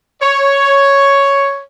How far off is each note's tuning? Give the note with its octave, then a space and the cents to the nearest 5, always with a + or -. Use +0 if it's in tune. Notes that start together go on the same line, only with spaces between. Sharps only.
C#5 +5